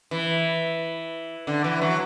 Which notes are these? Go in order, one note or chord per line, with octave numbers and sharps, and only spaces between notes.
E3
D3
E3
F#3